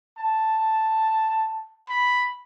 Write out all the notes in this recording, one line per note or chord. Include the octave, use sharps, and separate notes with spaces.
A5
B5